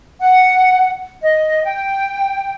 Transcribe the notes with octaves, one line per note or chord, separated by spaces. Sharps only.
F#5
D#5
G5